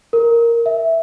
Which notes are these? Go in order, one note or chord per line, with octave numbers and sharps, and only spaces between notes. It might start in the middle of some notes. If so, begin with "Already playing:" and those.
A#4
E5